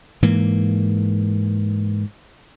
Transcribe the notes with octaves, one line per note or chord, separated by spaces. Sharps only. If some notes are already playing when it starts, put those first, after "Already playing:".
G#2 E3 A#3